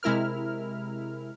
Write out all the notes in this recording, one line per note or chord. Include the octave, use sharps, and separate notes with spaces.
C3 G#3 E4 A#4 F6